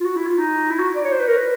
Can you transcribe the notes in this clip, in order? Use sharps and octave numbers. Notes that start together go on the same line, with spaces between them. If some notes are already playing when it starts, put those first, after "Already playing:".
F4
F#4
E4
F4
D#4
E4
F#4
D5
C#5
C5
B4
A#4
B4